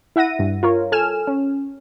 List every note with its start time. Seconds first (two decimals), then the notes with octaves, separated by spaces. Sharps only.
0.16 E4 E5 F#5 A#6 D#7
0.39 G2
0.63 F4 A#4 C#5
0.92 A4 G#5 F6 E7
1.27 C#4